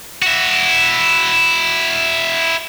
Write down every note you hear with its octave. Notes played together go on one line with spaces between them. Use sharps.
E4 F#4